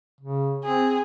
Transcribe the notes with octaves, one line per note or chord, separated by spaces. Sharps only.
C#3
C4 G#4